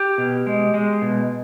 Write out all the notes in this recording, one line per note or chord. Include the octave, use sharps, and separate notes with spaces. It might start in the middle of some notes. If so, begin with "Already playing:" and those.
Already playing: G4
B2
G#3
G#3
B2